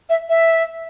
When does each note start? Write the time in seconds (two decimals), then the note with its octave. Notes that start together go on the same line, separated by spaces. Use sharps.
0.10 E5
0.29 E5